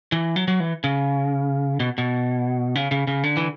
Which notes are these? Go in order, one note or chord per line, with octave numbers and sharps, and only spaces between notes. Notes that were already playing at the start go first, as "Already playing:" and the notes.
E3
F#3
F#3
E3
C#3
B2
B2
C#3
C#3
C#3
D3
E3